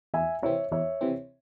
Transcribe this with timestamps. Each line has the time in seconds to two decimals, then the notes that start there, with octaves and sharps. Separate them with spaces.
0.14 E2 E5 G#5
0.43 C3 E3 C4 C#5 E5
0.72 E2 C#5 E5
1.01 C3 E3 C4